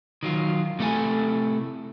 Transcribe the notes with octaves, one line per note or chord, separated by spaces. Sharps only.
D#3 F#3 F4
C3 A3 E4 A4 G#5